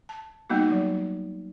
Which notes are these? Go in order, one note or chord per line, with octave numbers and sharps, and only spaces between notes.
A5
G3 A#3 B3 D#4 F#4
F#3